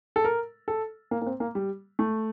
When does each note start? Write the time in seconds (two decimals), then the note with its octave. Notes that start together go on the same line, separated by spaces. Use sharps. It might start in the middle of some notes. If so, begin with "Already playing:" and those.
0.16 A4
0.24 A#4
0.68 A4
1.11 A#3
1.22 A#3
1.26 C4
1.40 A#3
1.55 G3
1.99 A3